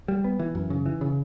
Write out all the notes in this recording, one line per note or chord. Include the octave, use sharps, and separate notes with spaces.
G3
B3
E3
F#2
C#3
E3
C#3